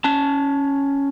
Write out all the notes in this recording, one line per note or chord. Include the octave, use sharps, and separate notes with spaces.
C#4 A5